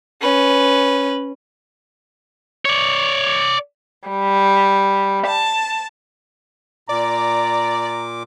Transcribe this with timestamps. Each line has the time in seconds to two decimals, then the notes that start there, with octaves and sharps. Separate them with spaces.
0.22 C#4 B4
2.65 C#5 D5
4.08 G3
5.27 A5
6.89 A#2 D5 A#5 D6